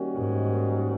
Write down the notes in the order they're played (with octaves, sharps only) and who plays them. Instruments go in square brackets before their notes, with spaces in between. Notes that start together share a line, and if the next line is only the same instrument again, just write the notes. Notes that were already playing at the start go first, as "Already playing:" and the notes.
Already playing: [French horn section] D#3 G3 A#3 C#4 F#4
[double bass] G#2